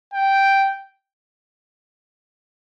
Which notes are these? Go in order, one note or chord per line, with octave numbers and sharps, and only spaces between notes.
G5